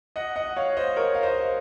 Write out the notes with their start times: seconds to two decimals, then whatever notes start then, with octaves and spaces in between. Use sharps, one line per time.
0.16 D#5 F#5
0.36 D#5 F#5
0.56 C#5 F5
0.77 C5 D#5
0.96 A#4 C#5
1.15 F5
1.23 C5 D#5